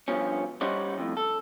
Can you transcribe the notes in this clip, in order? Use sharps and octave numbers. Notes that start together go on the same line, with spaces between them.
G2 B2 F3 C#4
G3 C#4 D#4 F#4 C5 D5
F2 A2
A4